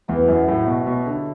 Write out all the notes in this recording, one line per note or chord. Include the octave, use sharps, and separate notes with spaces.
E2 F#3 B3 E4 G4
F#2
A2
B2
B2
D3